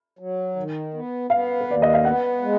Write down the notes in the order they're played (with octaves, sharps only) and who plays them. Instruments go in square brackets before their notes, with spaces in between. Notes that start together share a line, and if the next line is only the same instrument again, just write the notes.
[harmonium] F#3
D#3
B3
[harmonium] B3 [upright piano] F5
[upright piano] B4
[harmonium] D#2 [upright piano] D5
[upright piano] D#5
F5
[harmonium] B3 [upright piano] F#5
[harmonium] G#3